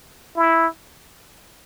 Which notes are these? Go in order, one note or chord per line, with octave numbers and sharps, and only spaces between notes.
E4